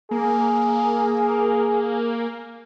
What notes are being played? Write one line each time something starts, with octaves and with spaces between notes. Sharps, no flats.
A#3 G#4